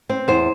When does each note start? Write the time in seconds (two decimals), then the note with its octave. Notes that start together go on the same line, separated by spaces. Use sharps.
0.09 C4
0.28 E2 C5